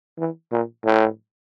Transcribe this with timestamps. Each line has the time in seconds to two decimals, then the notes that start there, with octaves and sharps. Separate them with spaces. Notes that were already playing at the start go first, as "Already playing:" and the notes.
0.18 E3
0.51 A#2
0.85 A2